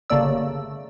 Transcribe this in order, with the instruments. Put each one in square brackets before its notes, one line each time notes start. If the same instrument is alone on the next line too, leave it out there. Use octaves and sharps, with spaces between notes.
[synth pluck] G1 C#3 A3 A#3 D5 E6